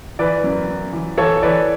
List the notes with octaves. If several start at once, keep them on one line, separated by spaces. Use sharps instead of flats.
E3 B4 D5
F#2
F#2
E3
E3 A4 C#5
E3 B4 D5